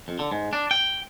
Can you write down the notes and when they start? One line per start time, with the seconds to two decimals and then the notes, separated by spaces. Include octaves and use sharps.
0.08 F2
0.19 D3
0.32 G#2
0.53 D4
0.71 G5